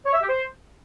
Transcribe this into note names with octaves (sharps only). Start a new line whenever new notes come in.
C#5
E5
G4
C5